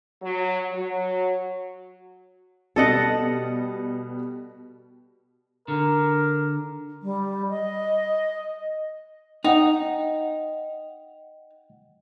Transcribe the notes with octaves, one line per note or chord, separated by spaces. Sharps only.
F#3
F#3
B2 G3 A4 D#5 F#5
D3 A#4
G3
D#5
D#4 D#5 F#5 G5